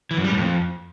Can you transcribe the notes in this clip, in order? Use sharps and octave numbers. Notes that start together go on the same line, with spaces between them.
E3
F#2
G3
A2
F2